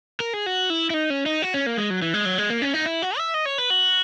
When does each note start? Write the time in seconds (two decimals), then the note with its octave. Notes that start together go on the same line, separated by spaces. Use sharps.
0.20 A#4
0.33 G#4
0.46 F#4
0.70 E4
0.90 E4
0.94 D#4
1.10 C#4
1.26 D#4
1.42 F#4
1.54 C#4
1.66 A#3
1.77 G#3
1.90 F#3
2.02 E3
2.14 G#3
2.25 F#3
2.38 G#3
2.50 A#3
2.62 C#4
2.74 D#4
2.86 E4
3.02 F#4
3.18 E5
3.34 D#5
3.46 C#5
3.58 B4
3.70 F#4